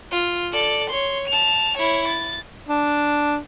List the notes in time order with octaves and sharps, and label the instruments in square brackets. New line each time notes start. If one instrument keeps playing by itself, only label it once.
[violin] F4
A4 D5
C#5 C6
A5 F7
E4 C#5
A6
[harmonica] D4